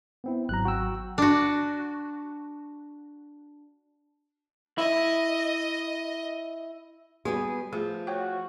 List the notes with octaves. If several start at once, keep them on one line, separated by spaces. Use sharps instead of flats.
B3 C4 E4
G#1 F#3 A#5 F#6
F#4 G5 E6
D4 F#4
E4 D#5
G3 B3 F#4 G#4
F3 A3 G#4
F#4 C5 C#5 G5